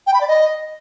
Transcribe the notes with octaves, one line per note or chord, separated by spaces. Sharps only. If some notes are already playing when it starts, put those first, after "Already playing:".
G5
B5
D5
D#5